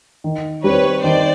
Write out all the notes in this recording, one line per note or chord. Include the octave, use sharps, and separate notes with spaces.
D#3
G3 C4 B4 C#5
D#3 C5 D5